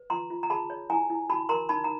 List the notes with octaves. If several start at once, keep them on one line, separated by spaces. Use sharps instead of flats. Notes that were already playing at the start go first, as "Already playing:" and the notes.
Already playing: B4
F4 A#5 C6
F4
A#5
G#4 A5 B5
C#5
E4 G#5 A#5
E4
F#4 A5 B5
A#4 A#5 C6
D#4 A5 B5
A#5